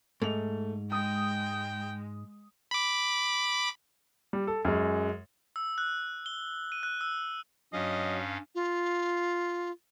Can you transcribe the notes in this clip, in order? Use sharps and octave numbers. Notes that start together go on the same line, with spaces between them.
G#2 A3 F7
G#3 G5 D#6
B5 D6
G3
A4
F#2 G#3
E6
F#6
G7
D#7
F#6
E6
G2 F#3 C#4 D#5 F5
F4